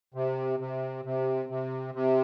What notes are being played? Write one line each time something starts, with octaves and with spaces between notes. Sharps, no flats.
C3
C3
C3
C3
C3